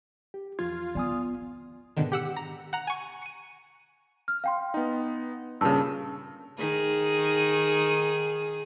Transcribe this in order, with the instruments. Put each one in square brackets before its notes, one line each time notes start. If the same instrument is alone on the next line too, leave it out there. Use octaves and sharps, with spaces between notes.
[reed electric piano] G4
[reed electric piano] E2 F3 G#6 [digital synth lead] F4
[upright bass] B3 [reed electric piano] D5 G#5 D#6
[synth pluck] G#2 B2 D3 D#3
G4 F#5 E6 C#7
A#5
F#5 A#5
G#5 C#6
C#7 D#7
[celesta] F6
F5 G5 C6
[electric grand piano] B3 D#4
[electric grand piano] G2 A#2 C#3 [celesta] A5 E6
[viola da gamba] D#3 G#4